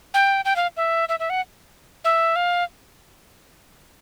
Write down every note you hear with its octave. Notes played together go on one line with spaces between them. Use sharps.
G5
G5
F5
E5
E5
E5
F#5
E5
F5